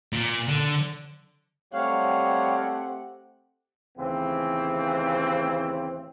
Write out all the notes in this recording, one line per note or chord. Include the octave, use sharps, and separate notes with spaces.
A#2
D3
G3 A3 C4 G4 C#5 F5 F#5
D#2 A2 C#3 E3 C4